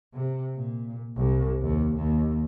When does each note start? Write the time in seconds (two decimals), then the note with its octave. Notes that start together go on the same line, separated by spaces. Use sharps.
0.13 C3
0.55 A#2
1.16 C2
1.62 D#2
1.97 D#2